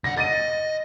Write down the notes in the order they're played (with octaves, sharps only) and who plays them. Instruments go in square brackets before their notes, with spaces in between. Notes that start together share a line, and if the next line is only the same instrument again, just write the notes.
[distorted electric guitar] C2 F#5 [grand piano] A#6
[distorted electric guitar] D#5 [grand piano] A6 A#6 D#7